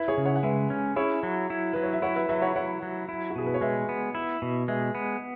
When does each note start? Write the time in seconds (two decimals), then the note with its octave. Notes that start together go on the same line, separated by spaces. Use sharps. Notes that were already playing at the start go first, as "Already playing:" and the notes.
Already playing: E4 B4 E5
0.08 G#4 C#5
0.17 C#3
0.26 C#5 F#5
0.36 F#5
0.43 G#3 B4 E5
0.70 C#4
0.96 E4 G#4 C#5
1.23 F#3
1.50 E4
1.73 F#3 B4
1.83 C#5
1.93 E5
2.02 E4 C#5 F#5
2.16 B4 E5
2.29 F#3 B4 E5
2.42 C#5 F#5
2.56 E4 C#5 F#5
2.82 F#3
3.09 E4
3.30 F#4
3.36 B2 G#4
3.46 B4
3.54 C#5
3.61 G#3 B4 E5
3.89 B3
4.15 E4
4.42 B2
4.68 G#3 B4 E5
4.95 B3